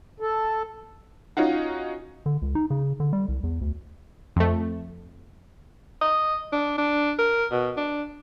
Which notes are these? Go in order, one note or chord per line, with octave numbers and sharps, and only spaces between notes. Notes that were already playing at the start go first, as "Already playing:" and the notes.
A4
C#4 D#4 F4 F#4
D3
C#2
D#4
C#3
D3
G3
C2
E2
D2
F2 A3
D#5
D4
D4
A#4
B2
D4